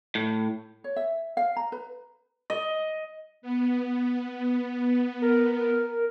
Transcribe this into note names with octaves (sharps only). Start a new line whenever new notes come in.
A2
C#5
E5
F5
A#5
B4
D#5
B3
A#4